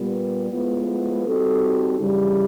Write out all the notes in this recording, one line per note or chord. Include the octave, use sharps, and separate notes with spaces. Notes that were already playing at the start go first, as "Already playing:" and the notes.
Already playing: A#2 G3 B3
A2 F3 G#3 B3
G3 C4 D#4 F#4 A4
F#2 C#3 E3 G3